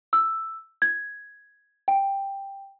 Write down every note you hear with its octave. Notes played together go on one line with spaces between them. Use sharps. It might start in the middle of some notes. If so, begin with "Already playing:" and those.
E6
G#6
G5